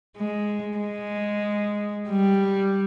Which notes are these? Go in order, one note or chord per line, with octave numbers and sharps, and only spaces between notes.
G#3
G#3
G3